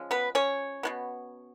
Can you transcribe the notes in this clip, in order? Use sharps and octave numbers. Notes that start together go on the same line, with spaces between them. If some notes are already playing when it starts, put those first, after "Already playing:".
Already playing: F3 G#3 C#4
B3 B4
C#4 C#5
B2 F#3 B3